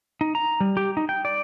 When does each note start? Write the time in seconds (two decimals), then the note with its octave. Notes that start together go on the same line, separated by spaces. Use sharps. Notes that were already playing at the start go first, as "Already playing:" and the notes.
0.21 D#4
0.35 A#5
0.61 G3
0.77 G4
0.97 D#4
1.09 G5
1.25 D5